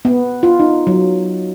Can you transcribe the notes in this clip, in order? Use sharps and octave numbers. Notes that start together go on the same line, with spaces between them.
B3
F4
D#4
F#3